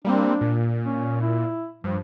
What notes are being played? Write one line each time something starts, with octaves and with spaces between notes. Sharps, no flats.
G3 A#3 C4 D4
A#2
C#4
E4
G2 F3